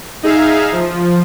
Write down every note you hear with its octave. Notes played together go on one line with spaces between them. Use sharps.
D#4 G#4 E5 F5
F3